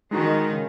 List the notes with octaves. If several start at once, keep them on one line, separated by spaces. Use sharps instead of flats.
D#3 G#3 D#4 F#4
C#3